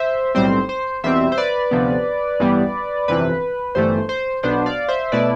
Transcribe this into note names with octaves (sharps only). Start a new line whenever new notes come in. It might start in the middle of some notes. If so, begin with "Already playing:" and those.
Already playing: C5 E5
B1 A2 G3 C4 C5
C5
E2 B2 G3 C4 C5 E5
C5
B4 D5
D2 C3 F3 B3
A1 G2 E3 G3 B3
G1 F2 C3 E3 B4
G1 G2 E3 A3 C5
C5
B1 B2 B3 D4 C5
D5 F5
C5 E5
B2 A3 E4 B4 D5